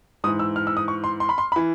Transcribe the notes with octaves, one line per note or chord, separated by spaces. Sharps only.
G#2 E3 D#6
E6
F6
E6
D#6
C#6
C6
C6
B5
C6
B5
E3